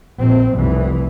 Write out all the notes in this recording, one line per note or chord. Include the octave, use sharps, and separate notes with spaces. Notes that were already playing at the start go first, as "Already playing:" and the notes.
A#1 C4
F1 C2 E3